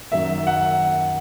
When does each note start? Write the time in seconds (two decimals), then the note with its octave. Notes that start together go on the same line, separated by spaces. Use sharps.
0.12 F#2 D#3 F#3 E5
0.47 F#5